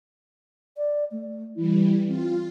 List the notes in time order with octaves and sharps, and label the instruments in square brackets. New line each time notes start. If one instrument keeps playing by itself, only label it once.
[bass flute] D5
A3
[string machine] E3 G3 [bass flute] E4
[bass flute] C4 [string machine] F4